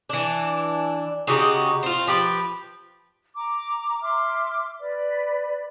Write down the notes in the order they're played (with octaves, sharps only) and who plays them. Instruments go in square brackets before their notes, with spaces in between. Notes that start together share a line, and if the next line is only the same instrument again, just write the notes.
[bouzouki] E3 D4
C#3 D#4 F#4 G4
C4 F4
F3 G4 B4
[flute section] A#5 D6
E5 C6 D6 F6
B4 D5